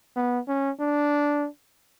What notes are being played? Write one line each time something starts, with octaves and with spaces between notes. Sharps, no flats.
B3
C#4
D4